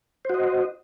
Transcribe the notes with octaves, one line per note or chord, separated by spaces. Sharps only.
F#4 C5 D#5